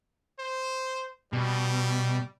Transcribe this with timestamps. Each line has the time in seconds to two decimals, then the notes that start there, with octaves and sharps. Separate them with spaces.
0.39 C5
1.33 B2 G3